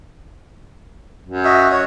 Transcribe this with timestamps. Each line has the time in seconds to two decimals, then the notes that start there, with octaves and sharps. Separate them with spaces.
1.26 F#2
1.44 F#4 D#5 E5
1.71 F#4 C#5